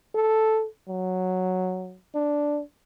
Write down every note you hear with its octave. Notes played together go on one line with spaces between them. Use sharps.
A4
F#3
D4